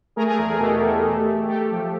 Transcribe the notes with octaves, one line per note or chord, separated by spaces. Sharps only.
A3 G#4 A#4
G#4 A#4
E2 G#4 A#4
G#4
B2 G4 A4
A3
A3
A3
A3 G4 A4
F3